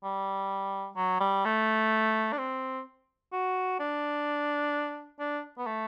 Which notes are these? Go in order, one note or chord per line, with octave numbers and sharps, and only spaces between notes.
G3
F#3
G3
A3
D4
C4
F#4
D4
D4
B3
A3